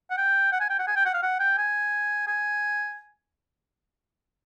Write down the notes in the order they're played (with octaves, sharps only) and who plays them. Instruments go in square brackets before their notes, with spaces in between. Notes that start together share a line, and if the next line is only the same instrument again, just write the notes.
[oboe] F#5
G5
F#5
G#5
G5
F#5
G#5
G5
F#5
F5
F#5
G5
G#5
G#5